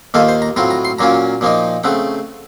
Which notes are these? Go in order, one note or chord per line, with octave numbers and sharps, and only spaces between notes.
D#2 D#3 A#3 F4 A4
C5
A#5
A2 F#3 C4 F4 A#5
A#5
C6
A#2 F#3 A#3 C#4 F4 A#5
A#2 F3 A#3 D#4
C#3 A3 C4 F#5